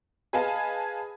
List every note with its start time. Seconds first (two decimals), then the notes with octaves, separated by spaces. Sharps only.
0.33 G#4 B4 D#5 F5 G#5 A5